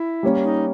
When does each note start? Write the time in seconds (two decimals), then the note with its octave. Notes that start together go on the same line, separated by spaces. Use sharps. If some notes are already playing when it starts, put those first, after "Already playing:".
Already playing: E4
0.23 G3 A#3 C#4
0.43 D#4